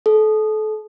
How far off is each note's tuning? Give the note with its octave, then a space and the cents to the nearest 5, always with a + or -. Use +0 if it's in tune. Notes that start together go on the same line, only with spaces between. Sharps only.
A4 -30